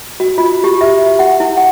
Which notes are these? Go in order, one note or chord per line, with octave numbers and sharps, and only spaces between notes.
F#4
F4
G4
E5
F#5
E4
F#5